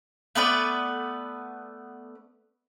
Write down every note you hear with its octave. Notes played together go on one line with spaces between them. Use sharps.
A3 B3 B4 D5